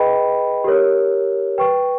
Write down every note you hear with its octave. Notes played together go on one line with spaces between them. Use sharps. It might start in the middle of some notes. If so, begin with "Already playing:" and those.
Already playing: G#4 B4 D#5 G5 B5
G4 A#4 C#5
B4 G5 C#6